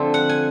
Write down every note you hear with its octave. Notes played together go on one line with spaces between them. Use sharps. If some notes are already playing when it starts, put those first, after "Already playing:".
Already playing: D3 F3 A3 C4
F#5
G#5